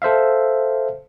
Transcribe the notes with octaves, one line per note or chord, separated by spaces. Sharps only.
A4 C5 E5 F5